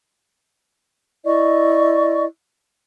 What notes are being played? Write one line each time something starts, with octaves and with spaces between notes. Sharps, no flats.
E4 D5 D#5 C#6